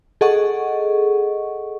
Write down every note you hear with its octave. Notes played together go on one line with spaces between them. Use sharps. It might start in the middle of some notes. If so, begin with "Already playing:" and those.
G#4 A4 D#5 F#5 C#6